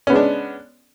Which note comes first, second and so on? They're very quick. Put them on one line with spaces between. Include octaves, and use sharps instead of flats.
C#4 B3 G#3 D4